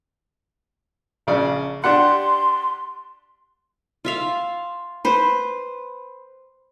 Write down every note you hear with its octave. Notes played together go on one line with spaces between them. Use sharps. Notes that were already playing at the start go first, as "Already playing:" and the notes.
A#1 C#3 D5
D4 G4 F#5 C6
F4 E5 F5
B4 C5